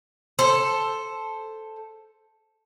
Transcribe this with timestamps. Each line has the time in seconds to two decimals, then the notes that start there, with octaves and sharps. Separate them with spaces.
0.39 A4 C5